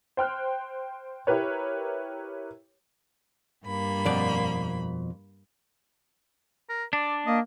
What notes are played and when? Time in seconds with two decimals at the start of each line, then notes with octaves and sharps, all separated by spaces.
0.17 C5 G5 F6 F#6
1.27 E4 G4 A#4 B4 C#5
3.65 G2 A#3 B5
4.06 F2 B2 D5
6.69 A#4
6.93 D4 D5
7.27 A#3 D#5